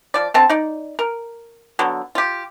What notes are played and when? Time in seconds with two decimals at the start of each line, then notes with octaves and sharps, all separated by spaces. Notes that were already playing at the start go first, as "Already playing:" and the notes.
0.14 F3 D5
0.34 D3 C4 A5
0.50 D#4 D5
0.99 A#4
1.79 D3 F#3 B3
2.15 F4 G4